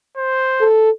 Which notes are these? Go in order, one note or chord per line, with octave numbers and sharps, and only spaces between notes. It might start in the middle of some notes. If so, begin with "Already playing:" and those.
C5
A4